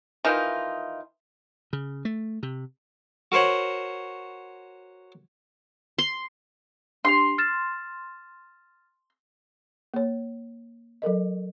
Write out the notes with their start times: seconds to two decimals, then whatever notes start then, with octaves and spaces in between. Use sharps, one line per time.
0.25 D#3 E3 D#4 F4
1.73 C#3
2.05 A3
2.43 C3
3.32 F#4 A#4 C5 C#5 F#5
5.98 C6
7.05 D4 G4 C6 F7
7.38 F6 A6 E7
9.94 A#3 C#5
11.02 F#3 A4 A#4 D#5